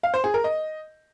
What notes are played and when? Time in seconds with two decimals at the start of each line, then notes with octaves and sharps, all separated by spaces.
0.03 F5
0.14 C5
0.24 G#4
0.34 A#4
0.44 D#5